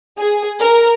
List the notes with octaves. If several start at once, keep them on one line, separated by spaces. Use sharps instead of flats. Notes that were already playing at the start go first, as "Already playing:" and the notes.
G#4
A#4